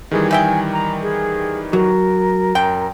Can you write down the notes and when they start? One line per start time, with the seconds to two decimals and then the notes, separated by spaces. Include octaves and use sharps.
0.11 D#3 E3 G3 G#4
0.31 D#4 E5 G5 G#5
0.72 A#5
1.02 G#4
1.73 F#3 A#4
2.55 F#2 G5